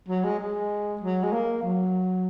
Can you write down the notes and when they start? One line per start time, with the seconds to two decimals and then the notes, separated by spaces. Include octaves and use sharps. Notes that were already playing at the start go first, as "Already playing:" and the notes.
0.08 F#3
0.24 G#3
0.40 G#3
1.01 F#3
1.23 G#3
1.33 A#3
1.63 F#3